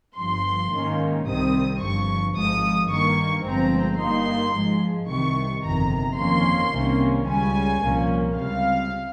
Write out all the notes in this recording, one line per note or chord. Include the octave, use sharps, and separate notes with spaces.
G1 G2 F3 C6
G#2 D#3 A#3 C#4
C2 C3 D#3 G3 C4 D#6
G1 G2 F3 C#6
G#1 G#2 F3 D#6
G2 D#3 A#3 C#6
G1 G2 F3 G#3 C4 A#5
G2 G3 A#3 D#4 C6
G#2 F3 G#3
C2 C3 D#3 C#6
G1 F2 C3 D#3 A#5
F2 D#3 A#3 C#4 C6
C2 C3 D#3 A#3 C#4
C#2 C#3 G3 C#4 G#5
C2 A#2 F3 A#3 C#4
C#2 C3 G3 F5